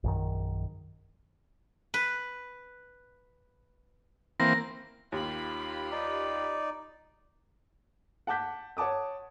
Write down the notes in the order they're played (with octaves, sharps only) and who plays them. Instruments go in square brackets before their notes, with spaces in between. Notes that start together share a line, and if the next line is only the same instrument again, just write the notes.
[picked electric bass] A#1 F#2 D#3
[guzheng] B4
[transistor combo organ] E3 A#3 C4 [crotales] A#6
[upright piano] D#2 [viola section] F4 G4 B5
[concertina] D#4 D5
[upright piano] F#5 A5 D6 G6 B6
C#5 F#5 A5 D6 D#6